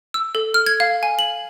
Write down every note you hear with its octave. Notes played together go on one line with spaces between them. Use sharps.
E6
A4
F6
G#6
F5
G#5
F#7